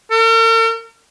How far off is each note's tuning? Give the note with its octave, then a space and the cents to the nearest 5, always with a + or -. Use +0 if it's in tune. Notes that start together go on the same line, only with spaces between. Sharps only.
A#4 -45